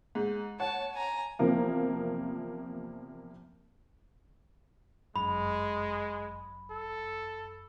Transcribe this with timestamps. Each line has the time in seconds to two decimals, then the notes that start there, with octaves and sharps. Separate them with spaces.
0.15 G#2
0.60 C#5 F#5 A5
0.94 G#5 A#5
1.39 E2 C3 F3 A#3
5.16 G1 F#2 G#3 B5
6.71 A4